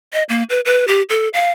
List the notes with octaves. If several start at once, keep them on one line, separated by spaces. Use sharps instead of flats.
D#5
A#3
B4
B4
G4
A4
F5